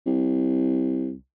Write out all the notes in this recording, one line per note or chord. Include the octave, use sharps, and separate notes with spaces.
C2